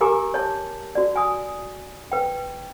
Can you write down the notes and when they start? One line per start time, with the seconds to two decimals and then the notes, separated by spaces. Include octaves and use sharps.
0.01 G4 A#4 G#5 A#5 D6
0.34 C#5 A5
0.95 F#4 D5
1.16 G#5 D#6
2.12 B4 G5